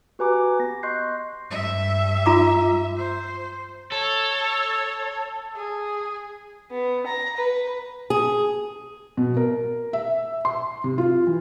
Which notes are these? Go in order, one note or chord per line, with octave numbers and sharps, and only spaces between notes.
F#4 G4 B4 G#5 A#5 D6
B3 A#6
D#5 C6 C#6 F#6 G6 C7
G2 E5
F4 A#5 D6
C5
A4 C#5
G#4
B3
A#5
B4
G#4
B2
A#4
E5
C6
C3
F4
E3